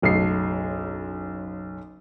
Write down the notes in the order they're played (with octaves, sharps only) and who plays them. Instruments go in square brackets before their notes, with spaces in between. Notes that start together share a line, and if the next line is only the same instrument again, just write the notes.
[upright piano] F#1 B1 A3 C7